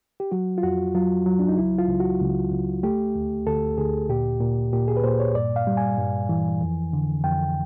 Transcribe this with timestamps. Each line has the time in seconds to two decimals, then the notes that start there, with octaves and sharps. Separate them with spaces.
0.20 G4
0.32 F#3 F#4
0.58 F4
0.63 F2 F#4
0.95 F#3 F4
1.26 F#3
1.39 D4
1.48 D#4
1.58 C#2 E4
1.79 F4
1.89 C#2
2.00 F#4
2.21 C#2
2.52 C#2
2.83 A3 G4
3.15 D2
3.47 D2 A4
3.78 D2 G#4
4.09 A#2 G4
4.40 A#2
4.73 A#2 G4
4.88 G#4
4.97 B4
5.04 A#2 C5
5.20 C#5
5.35 G2 D5
5.56 F5
5.67 G3
5.77 G#5
5.98 G2
6.29 E3
6.61 F2
6.93 D3
7.24 F2 G5